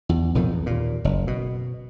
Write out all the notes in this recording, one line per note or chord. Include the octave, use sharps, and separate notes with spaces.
E2
B1 F2 A2 D#3
E2
D#2 A#2
F#1
B2